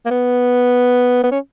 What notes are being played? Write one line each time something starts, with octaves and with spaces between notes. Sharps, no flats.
A#3
B3
B3
C#4